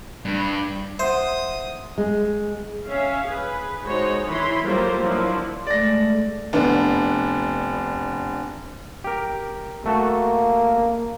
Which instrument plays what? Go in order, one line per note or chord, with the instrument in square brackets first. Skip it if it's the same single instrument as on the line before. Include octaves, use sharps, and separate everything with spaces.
[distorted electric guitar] G2
[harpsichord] C5 [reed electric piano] E5 F#5 [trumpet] D#6
[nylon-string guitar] G#3
[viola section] C#4 E5 F5
G#4 B4
G#3 D#4 F#4 C5 C#5
E3 C#5 B5 C6
F#3 G3 A#3 F4 A4 C5
F3 F#3 A#3 D4 E4
[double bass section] G#3 A3 [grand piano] D5 A#6
[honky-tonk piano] F1 B3 D4
[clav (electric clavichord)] G4 A#4
[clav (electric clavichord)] A3 F#4 A4 [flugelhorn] A#3